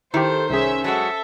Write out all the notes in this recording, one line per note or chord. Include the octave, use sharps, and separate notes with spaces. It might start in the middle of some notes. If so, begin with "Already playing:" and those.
D#3 E4 G4 A4 C5
C2 C#4 G#4 E5
F#3 G#3 F#4 A4 E5